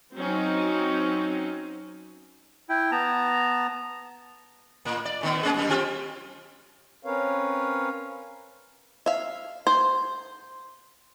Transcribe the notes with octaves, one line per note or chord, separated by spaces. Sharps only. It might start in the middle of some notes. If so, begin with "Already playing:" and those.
F#3 C4 C#4 D#4
E4 G5
B3 A5 A#5
A2 A#3
D5
A#2 D#3 B3
A3 C#4 G#4
F#2 G3 A#3
C4 F4 G4
C4 C#4 A#4 B4 C#5 F5
E5 F5
C5